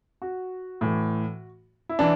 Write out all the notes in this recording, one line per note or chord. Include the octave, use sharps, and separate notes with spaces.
F#4
A2 E3
E4
E3 D4